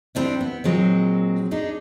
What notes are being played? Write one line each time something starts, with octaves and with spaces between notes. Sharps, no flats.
G3 C4 D4 E4
B3
A#2 F#3 G#3 C4
D4 D#4 G#4